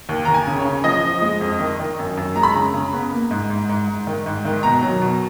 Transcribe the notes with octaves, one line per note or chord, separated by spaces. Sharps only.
D#2
D#2 A#5
G#5
C#3
C#5
C#3
F3 D#5
F3
G#3
F2
D#3
D#3
F#2
F#2
G#3 A#5
B5
C#3 A#5
C#3
B3
A#3
G#2
G#2
G#2
G#2
D#3
G#2
D#3
B2 A#5
F#3
B2